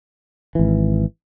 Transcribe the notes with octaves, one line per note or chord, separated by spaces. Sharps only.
G#1 E3